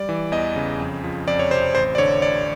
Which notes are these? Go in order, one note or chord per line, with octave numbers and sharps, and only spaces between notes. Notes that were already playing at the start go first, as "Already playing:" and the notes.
Already playing: G3 D5
E3
E2 D#5
C#3
F2
F3
F2 D5
C#5
C3 C5
A1 C5
D5
D3 C#5
A1 D5